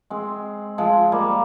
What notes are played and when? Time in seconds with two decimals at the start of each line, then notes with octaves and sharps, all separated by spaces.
0.10 G#3 C4
0.78 F3 G#3
1.12 G3 A#3